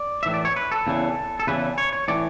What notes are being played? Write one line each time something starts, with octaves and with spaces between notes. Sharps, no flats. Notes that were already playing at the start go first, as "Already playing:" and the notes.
Already playing: D5
A2 E3 E5
D5
C#5
B4
A4
E2 C#3 E3
A4
E2 C#3 E3 B4
C#5
C#5
A2 E3 D5